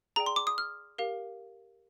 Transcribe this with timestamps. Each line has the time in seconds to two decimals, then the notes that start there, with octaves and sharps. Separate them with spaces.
0.16 G#4 D5 G5 A#5
0.26 C6
0.36 D6
0.47 D#6
0.58 F6
0.98 G4 A#4 F5